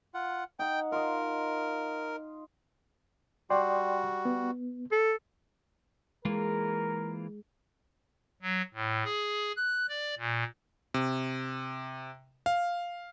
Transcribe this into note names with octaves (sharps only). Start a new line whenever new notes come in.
F4 F#5
D#4 F#5 G5
F4 A#4 D#5
G3 F#4 D5 G5 C6
B3
A4
E3 G#3 A#3 F4 A#4
F#3
A2
G#4
F#6
D5
A#2
C3
F5